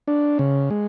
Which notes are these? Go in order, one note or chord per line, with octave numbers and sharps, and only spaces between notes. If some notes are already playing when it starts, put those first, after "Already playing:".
D4
C#3
G#3